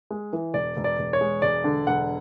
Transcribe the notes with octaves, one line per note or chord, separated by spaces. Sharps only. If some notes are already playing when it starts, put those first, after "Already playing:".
G#3
E3
E1 D5
E1
D5
E1
C#5
G#3
E1 D5
D3
E1 F#5